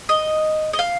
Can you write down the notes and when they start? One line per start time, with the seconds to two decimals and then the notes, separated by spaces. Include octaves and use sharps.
0.09 D#5
0.73 D#5
0.79 F5